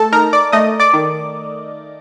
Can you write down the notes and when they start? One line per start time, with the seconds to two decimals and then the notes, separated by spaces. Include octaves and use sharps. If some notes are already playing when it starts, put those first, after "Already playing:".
Already playing: A3 A4 A5
0.12 D#4 A#4 A#5
0.33 D5 D6
0.52 A3 D#5 D#6
0.80 D5 D6
0.93 D#3